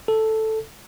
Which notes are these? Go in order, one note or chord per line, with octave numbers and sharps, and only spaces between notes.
A4